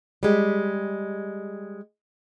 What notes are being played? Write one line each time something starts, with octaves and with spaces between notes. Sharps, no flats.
G3 G#3 G4